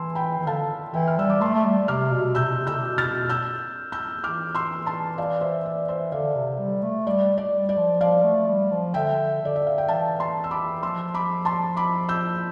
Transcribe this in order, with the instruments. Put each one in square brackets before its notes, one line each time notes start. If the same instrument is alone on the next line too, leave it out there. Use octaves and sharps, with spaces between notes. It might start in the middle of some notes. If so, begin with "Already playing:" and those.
Already playing: [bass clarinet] E3 [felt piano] A5 C6 E6
[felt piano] G5 B5
[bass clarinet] E3
[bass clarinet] D3 [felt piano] F5 A5
[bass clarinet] E3 [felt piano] E5 G5
[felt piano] F6
[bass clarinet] G3 [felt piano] E6
[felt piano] D6
[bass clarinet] A3 [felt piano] A5 C6
[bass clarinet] A3
G3
[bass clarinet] C3 [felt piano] D6 F6
[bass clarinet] B2
[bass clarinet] C3 [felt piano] E6 G6
[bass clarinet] C3
[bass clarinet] D3 [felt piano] E6 G6
[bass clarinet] C3
B2
[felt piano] F6 A6
[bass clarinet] B2
[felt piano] E6 G6
E6 G6
[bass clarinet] E3 [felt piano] D6 F6
[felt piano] C6 E6
A5 C6
D5 F5
C5 E5
D5
C5 E5
[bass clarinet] D3 [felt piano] D5 F5
[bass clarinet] C3
G3
A3
[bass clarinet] G3 [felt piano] D5
[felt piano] D5
[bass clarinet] G3
[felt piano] D5
[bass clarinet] F3
[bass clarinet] F3 [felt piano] D5 F5
[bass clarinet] A3
G3
F3
[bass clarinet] D3 [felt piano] E5 G5
[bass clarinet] D3 [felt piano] D5
[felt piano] E5
F5
G5
[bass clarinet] E3 [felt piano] F5 A5
[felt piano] A5 C6
E6
B5 D6
[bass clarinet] F3 [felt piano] C6 E6
[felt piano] B5 D6
A5 C6
B5 D6
E6 G6